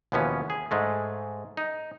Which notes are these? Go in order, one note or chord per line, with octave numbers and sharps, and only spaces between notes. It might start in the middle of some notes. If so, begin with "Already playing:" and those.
D#2 B2 E3 F3 B3 C#4
G#4
G#2 G#3 A3
D#4